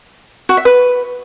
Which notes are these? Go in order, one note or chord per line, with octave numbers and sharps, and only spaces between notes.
F#4
E5
B4